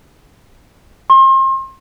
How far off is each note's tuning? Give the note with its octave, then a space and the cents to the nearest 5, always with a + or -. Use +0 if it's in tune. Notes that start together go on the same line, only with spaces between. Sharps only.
C6 +35